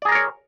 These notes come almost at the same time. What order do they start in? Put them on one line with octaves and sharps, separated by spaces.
D5 G#4 A#5 A#4 C#5